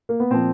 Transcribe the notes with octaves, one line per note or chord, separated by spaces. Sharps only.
A#3
B3
A#2 F3 C4